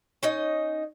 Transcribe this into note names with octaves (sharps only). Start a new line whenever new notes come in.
C#4 D#4 D#5